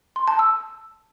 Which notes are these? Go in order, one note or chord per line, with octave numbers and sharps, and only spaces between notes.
C6
A5
E6